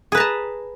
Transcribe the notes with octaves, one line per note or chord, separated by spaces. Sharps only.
G#4 B4 A5 A#5